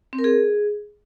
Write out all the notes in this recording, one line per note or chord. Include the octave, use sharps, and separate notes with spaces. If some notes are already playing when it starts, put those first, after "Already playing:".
C4
A#4
G#4